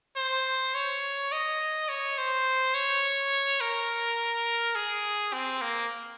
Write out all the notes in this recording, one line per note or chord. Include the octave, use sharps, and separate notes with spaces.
C5
C#5
D#5
C#5
C5
C#5
A#4
G#4
C4
A#3